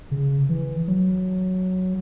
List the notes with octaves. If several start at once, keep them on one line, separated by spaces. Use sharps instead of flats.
C#3
E3
F#3